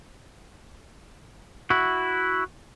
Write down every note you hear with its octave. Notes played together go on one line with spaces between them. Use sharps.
E4 F#4